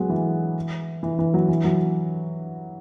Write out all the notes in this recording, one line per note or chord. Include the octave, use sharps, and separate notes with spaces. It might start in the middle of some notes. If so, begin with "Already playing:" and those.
Already playing: F#3 G#3 B3
E3
E3
E3
F#3
E3
F#3